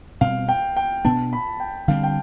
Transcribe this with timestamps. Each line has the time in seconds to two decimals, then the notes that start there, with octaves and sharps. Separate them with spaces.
0.21 B2 G3 C4 F5
0.49 G5
0.77 G5
1.05 B2 B3 D4 A5
1.33 B5
1.60 G5
1.88 D3 G3 C4 F5
2.03 G5